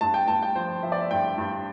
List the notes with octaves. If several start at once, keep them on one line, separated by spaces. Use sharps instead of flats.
G2 A5
G5
G2 A5
G5
F3 C5
F3 E5
D5
E5
G2 G5
G2